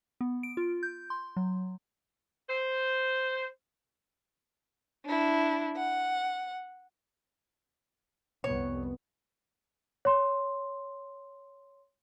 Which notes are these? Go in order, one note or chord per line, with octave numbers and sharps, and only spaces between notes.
B3
D7
F4
G6
C6
F#3
C5
D4 E4
F#5
C2 F2 B3 C#5
C#5 C6